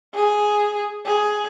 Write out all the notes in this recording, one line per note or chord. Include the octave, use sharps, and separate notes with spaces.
G#4
G#4